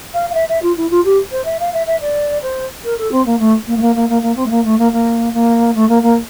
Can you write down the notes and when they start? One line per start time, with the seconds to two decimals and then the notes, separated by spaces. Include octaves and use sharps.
0.14 F5
0.29 F5
0.34 E5
0.48 E5
0.62 F4
0.76 E4
0.90 F4
1.04 G4
1.31 C5
1.45 E5
1.59 F5
1.73 E5
1.86 E5
2.00 D5
2.41 C5
2.84 A#4
2.98 A4
3.11 C4
3.25 A#3
3.39 A3
3.66 A#3
3.76 A3
3.81 A#3
3.95 A#3
4.09 A#3
4.22 A#3
4.35 C4
4.45 A3
4.50 A#3
4.64 A3
4.78 A#3
4.92 A#3
5.33 A#3
5.74 A3
5.88 A#3
6.02 A#3